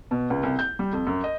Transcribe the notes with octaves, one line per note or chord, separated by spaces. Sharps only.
B2
C#2
C2
G6
G3
F2
F#2
D#5